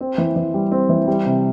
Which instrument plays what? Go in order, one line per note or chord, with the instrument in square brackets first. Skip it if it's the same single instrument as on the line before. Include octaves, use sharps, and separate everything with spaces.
[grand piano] C4
E3
E3
G3
C4
E3
G3
C3